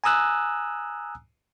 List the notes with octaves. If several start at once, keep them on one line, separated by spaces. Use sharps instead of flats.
G#5 A#5 D#6 E6 F#6